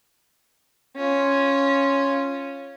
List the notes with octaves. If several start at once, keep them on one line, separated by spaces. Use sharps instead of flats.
C#4 F4